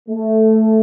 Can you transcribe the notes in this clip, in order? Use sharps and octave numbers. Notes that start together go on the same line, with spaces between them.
A3